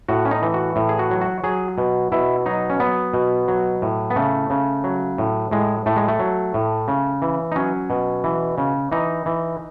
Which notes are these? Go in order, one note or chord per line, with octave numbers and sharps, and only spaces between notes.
A2 F#4
C#4
D#4
E3
F#4
A2
G#4
F#4
F#3
F#4
F#3 G#4
B2
B2 E4
F#3 D#4
C#4
F#3 B3
B2
F#3
A2
B3
C#3 A3
C#3
F#3
A2
A2 G#3
A2 A3
G#3
A3
F#3
A2
C#3
E3
D#4
F#3 C#4
B2
E3
C#3
E3 D#4
E3